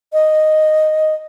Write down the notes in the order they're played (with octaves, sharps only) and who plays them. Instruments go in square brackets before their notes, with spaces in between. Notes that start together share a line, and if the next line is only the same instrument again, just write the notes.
[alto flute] D#5